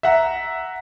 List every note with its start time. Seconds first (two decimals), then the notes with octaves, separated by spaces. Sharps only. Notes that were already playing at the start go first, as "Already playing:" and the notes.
0.03 E5 F#5 A#5